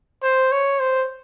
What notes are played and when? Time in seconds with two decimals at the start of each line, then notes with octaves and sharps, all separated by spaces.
0.23 C5
0.52 C#5
0.80 C5